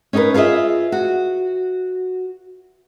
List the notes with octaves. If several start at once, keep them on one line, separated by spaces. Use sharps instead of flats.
C#4 D#4 G4 A#4 B4
F4 G#4 C#5 D#5 E5
F#4